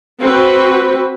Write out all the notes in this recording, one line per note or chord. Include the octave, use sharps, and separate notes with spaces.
C4 F#4 B4